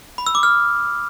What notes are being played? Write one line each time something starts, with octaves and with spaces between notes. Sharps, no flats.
B5
E6
D6
F6